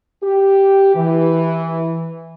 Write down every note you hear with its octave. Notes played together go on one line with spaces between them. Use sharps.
G4
E3